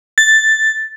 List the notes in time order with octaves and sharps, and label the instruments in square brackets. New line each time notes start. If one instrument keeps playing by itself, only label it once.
[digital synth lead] A6